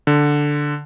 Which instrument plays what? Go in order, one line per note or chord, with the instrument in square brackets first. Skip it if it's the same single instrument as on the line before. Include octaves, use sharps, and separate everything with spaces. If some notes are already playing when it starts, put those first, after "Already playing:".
[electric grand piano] D3